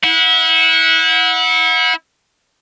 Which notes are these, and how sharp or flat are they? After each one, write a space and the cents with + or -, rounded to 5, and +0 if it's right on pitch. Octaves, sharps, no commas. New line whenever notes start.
E4 -25 F#5 -20